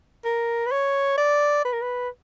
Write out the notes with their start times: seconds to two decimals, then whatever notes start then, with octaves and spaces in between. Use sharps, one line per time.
0.25 A#4
0.66 B4
0.72 C#5
1.18 D5
1.65 B4
1.73 A#4
1.81 B4